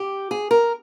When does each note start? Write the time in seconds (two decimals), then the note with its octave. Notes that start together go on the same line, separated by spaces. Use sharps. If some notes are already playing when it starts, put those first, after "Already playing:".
Already playing: G4
0.31 G#4
0.51 A#4